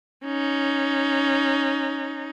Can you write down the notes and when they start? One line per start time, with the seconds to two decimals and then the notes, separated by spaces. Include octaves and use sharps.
0.25 C#4 D#4